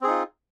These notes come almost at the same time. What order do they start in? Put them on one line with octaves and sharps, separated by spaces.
C4 G#4 D#4 F4